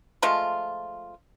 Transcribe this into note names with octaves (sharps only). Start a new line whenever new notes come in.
F3 G#3 A3 F4